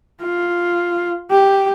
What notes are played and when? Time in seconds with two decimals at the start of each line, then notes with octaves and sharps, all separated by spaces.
0.21 F4
1.31 G4